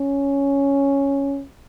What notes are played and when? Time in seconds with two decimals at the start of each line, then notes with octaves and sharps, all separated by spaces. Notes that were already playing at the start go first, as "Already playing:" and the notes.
Already playing: C#4